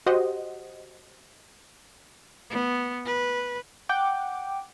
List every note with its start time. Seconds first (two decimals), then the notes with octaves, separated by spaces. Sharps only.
0.06 F#4 G4 C5 D#5 F#5
2.50 B3
3.06 B4
3.89 F#5 G5 D6